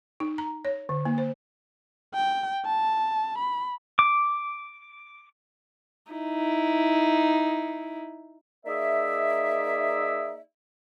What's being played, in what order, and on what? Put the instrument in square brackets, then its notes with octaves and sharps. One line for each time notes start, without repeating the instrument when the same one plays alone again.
[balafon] D#4
A#5
C#5
D3
A#3
C5
[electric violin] G5
A5
B5
[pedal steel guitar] D6
[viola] D#4 E4
[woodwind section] A#3 D#4 G#4 D5 E5